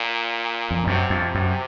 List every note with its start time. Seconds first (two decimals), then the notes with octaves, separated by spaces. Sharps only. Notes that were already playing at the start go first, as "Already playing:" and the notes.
Already playing: A#2
0.71 F2
0.87 F#2 C3
1.10 F2
1.35 F#2